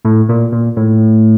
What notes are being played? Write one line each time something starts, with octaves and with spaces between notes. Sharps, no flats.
A2
A#2
A#2
A2